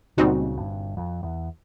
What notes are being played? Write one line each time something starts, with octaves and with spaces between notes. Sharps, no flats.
C#2 A#2 C#3 G3 C4 D#4 F#4
G1 G2
F2
E2